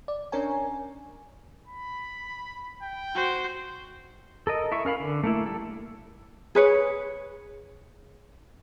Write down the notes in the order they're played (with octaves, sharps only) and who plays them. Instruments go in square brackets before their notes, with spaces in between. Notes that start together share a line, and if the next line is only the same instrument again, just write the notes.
[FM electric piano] D5
C#4 D4 A#4 C#5 G#5
[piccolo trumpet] B5
G5
[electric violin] F#4 C5
[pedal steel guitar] A4 A#4 D#5
E4 E5 C#6
C#4 A#4 F5 B5
D3
A3 A#3 E4
G3 A4
[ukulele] G#4 B4 C#5